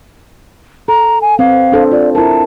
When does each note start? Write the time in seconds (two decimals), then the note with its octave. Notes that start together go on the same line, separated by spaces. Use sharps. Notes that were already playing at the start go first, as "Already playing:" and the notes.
0.88 A4 A#5
1.22 G#5
1.39 C4 B4 F5
1.72 D4 A4 C5
1.92 F4 D5
2.15 E4 A#4 A5